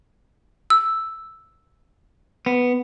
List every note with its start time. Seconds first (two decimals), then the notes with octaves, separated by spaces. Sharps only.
0.70 E6
2.46 B3